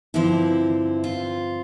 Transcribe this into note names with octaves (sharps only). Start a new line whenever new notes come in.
G2 D3 F3 C4 E4
F4